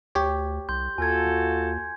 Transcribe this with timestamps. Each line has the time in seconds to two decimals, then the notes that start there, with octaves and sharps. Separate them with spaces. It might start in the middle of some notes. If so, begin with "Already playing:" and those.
0.15 D2 G4 C#5
0.69 C2 C6 G6
0.98 D#2 F4 F#4 A4 G#5 G#6